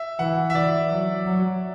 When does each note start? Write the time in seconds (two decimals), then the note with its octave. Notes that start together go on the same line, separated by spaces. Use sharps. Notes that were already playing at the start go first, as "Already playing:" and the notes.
Already playing: E5
0.19 E3 F#5
0.50 E5
0.55 E3 D5
0.91 F#3
1.26 F#3